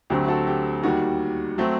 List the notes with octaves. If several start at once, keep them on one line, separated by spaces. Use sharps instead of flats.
D2 D3 F#3 A3 C4 G4
F#4 A4
G4
D#2 D#3 G3 F#4
F#3 A3 C4